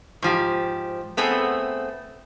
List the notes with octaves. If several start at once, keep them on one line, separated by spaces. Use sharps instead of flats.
G#2 F3 G4
A3 B3 C4 G#4